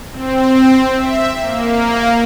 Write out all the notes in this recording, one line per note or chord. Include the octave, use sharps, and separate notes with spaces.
C4
E5
A#3